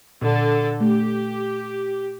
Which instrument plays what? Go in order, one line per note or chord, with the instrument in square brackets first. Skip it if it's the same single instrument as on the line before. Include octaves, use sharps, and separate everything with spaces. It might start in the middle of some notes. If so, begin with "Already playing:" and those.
[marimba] A#2 [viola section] D3 A4
[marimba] A3 [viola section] G4